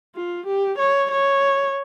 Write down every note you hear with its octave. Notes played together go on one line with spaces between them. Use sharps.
F4
G4
C#5
C#5